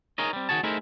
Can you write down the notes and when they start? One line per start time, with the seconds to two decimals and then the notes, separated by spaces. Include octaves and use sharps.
0.18 D#4 G#4 A#4 C#5 D#5
0.33 G3 C4
0.49 D#3 F#4 G#4 C#5 A5
0.63 A3 D#4 E4 G#4 A#4 C5